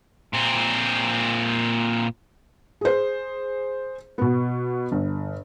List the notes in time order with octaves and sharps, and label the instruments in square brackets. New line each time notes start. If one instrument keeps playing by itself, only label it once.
[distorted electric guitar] A#2 C4
[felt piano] G#4 C5
B2 B3
G1